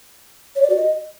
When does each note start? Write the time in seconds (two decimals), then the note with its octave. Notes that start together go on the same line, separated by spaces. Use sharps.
0.56 C#5
0.63 D5
0.70 F#4
0.77 D#5